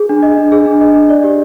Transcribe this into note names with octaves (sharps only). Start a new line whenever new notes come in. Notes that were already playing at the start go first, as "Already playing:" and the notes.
Already playing: G#4
D4
D#5
D4
G#4
D4
D#5
D4
D5
G4